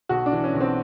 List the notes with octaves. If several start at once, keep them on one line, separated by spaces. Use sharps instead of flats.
B1 F#4
D4
E3
C#4
B1
C4